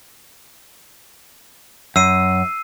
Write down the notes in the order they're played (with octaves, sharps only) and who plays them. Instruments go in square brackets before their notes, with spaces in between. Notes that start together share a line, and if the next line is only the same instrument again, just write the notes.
[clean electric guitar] F#2 [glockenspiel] E6 C7 D#7